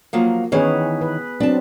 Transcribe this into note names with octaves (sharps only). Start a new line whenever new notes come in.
F3 F#3 A#3
D#3 E3 B3 C#4 G#4 B4
B4
F#3 C4 D4 A5